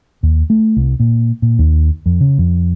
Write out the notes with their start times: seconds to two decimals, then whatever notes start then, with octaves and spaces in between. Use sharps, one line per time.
0.23 D#2
0.50 A3
0.77 C2
1.00 A#2
1.42 A#2
1.59 D#2
2.06 F2
2.21 C#3
2.38 F2